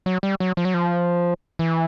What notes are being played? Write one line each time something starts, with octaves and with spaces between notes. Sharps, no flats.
F#3
G3
F#3
F3
F#3
F3
E3